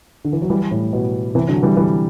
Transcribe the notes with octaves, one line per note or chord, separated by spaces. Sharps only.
D3
E3
F#3
E3 G3
A2
B2
C3 E3
D3 F#3
E3 G3
E3 G3